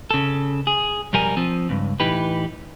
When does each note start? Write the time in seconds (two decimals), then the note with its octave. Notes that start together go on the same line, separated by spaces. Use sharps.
0.11 C#3 A4
0.67 G#4
1.13 B1 F2 G3 A#4 G#5
1.37 F3 C4
1.69 C#2 G2
2.00 A2 E3 D#4 G4 B4